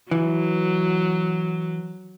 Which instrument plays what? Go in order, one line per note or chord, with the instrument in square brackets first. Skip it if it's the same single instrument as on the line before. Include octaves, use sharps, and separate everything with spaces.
[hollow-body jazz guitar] E3 [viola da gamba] F#3